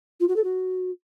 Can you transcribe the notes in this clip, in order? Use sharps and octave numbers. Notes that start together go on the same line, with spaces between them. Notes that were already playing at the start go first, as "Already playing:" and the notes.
F4
F#4
A4
F#4